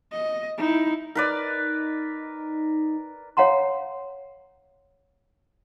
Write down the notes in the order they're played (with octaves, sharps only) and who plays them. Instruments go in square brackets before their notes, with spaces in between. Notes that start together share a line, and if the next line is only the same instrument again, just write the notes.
[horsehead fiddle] D#5
D#4 E4
[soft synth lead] D#4 [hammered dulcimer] A#4 B4 D5
[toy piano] C#5 F5 F#5 A#5 C6